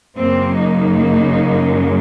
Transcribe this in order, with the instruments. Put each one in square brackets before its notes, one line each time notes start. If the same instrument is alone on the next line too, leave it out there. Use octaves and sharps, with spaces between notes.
[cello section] F#2 C#3 F#3 A#3 C4
D#4